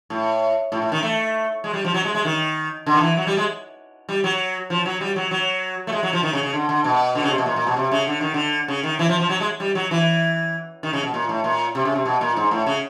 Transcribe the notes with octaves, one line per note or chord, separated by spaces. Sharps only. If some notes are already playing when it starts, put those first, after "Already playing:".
A2
A2
A2
D#3
A3
G#3
G3
F3
F#3
G#3
G#3
D#3
D3
D#3
E3
F#3
G3
G#3
G3
F#3
F3
F#3
G3
F#3
F#3
A3
G#3
F#3
F3
D#3
C#3
C#3
D3
D3
B2
D3
C#3
C3
B2
A#2
A#2
B2
C3
C#3
D3
D#3
D3
C#3
D#3
E3
F3
F3
F#3
G#3
G3
F#3
E3
D#3
C#3
B2
A#2
A2
A#2
C3
C#3
C3
B2
A#2
G#2
A2
C#3